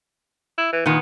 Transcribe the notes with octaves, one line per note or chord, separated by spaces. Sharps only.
E4
E3
A#2 D#3 B3